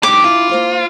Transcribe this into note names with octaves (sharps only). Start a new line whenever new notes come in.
G#2 F#3 D4 G4 E5 D6
E4 F4
A#3 C5 F5